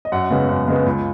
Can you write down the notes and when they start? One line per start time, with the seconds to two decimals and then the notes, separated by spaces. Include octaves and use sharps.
0.05 D#5
0.12 F#2 F#5
0.30 C#3 G#3 B3
0.49 F#2
0.67 C#3 G#3 B3
0.86 C#2